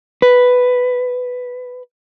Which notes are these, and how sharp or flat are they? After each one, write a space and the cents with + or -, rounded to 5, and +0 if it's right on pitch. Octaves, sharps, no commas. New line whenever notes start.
B4 +5